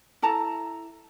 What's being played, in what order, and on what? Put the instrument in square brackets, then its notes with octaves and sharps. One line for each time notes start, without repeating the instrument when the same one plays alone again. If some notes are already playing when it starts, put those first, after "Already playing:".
[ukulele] E4 A4 A5 A#5